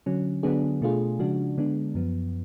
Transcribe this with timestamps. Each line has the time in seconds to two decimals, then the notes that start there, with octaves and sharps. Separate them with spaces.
0.06 D3 F#3 C#4
0.43 D3 F#3 B3 D4 G#4
0.81 B2 A3 D4 F4 G#4
1.19 C#3 F3 G#3 D4 F#4
1.58 D3 G#3 B3 D4
1.95 F#2 F3 B3